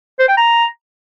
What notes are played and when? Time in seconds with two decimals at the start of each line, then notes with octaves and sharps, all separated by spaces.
0.19 C5
0.28 G5
0.37 A#5